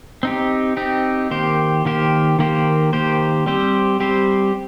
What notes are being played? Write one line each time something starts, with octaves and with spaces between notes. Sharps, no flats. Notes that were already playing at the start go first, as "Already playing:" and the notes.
C4 D#4 G4
C4 D#4 G4
D#3 A#3 G4 C5
D#3 A#3 G4 C5
D#3 A#3 G4 C5
D#3 A#3 G4 C5
G3 C4 G4 C5
G3 C4 G4 C5